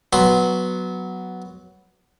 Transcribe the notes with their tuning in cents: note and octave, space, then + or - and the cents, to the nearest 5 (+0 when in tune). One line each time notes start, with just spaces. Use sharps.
F#3 +0 B3 +0 C6 +0